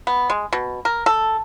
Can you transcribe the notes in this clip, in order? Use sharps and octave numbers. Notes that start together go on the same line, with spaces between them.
B3
G#3
B2
A#4
A4